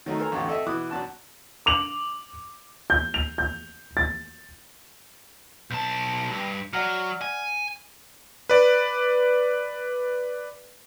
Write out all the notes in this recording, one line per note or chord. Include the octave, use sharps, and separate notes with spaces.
D#3 F#3 A3 D#4
A4 A#4 C5 G#5 A#5
A1 E2 G2 D3 A3
C4 A4 D#5 E5
B2 E3 D6 D#6 F#6
F#2 B2 D4 F#4 A5 F#6
D6 F7 F#7
G6
F7
G6
A6
B1 A5 G6
G2
F#3 D5 F#5 F6
G#5
B4 D5